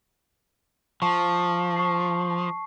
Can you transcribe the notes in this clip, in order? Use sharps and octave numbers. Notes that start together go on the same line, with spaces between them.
F3 A5 C#6
C#6 C7